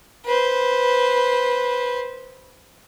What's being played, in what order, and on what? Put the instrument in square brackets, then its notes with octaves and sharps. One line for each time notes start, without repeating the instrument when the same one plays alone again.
[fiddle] B4 C5